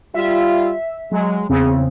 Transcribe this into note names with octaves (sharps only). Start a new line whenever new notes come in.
G3 F4 E5
F#3 G#3
E2 C#3 C4 G#4